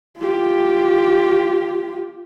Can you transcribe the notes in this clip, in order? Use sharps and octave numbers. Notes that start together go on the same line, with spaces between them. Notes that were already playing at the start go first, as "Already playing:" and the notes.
F4 G4